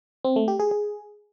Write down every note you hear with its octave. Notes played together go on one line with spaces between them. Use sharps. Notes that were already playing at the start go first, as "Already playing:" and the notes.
C4
A3
G4
G#4
G#4